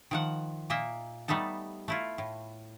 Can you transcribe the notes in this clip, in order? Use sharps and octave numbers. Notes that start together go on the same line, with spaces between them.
D#3 F3 F#5
A#2 A#3 D#5 E5
G3 A3 B3 D#4 A4
A3 E4 F4
A2